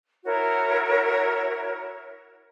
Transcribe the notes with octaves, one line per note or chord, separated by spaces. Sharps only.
E4 F#4 A#4 C#5